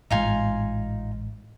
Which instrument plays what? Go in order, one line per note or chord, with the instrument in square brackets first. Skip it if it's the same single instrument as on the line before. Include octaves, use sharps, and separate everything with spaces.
[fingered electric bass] A1 G#2 G#3 [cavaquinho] D#4 F4 G#5